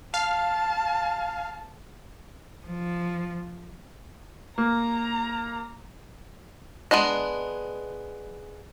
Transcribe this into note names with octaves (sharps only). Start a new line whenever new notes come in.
F5 A5
F3
A#3 A#5
G#3 B3 D4 D#5